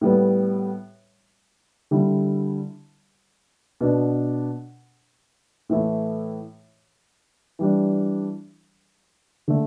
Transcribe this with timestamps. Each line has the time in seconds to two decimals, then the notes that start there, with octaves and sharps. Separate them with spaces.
0.01 A2 G3 B3
1.91 D3 G3 E4
3.81 B2 B3 D4
5.69 A2 E3 A3 E4
7.59 E3 G3 D4
9.48 D3 A3